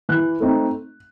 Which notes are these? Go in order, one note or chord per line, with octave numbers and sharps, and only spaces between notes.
E3 F#6
A3 C4 D#4